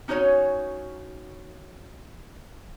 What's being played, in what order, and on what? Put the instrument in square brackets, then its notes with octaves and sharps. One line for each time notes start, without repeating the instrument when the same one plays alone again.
[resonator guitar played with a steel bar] C#4 D#4 F#4 B4 C#5 G#5